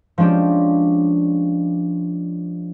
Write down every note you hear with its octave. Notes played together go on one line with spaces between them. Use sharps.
F3 G#3 C#4 D4 G4